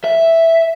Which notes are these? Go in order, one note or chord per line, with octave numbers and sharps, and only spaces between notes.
E5